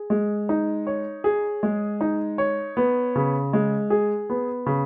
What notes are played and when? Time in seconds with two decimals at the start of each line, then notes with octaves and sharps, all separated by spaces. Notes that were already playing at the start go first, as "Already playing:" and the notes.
Already playing: G#4
0.10 G#3
0.49 D#4
0.87 C#5
1.24 G#4
1.63 G#3
2.01 D#4
2.38 C#5
2.77 B3
3.15 C#3
3.53 G#3
3.90 G#4
4.30 B3
4.66 C#3